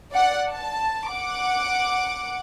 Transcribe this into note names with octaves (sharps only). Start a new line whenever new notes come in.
D5 F#5
A5
F#5 D6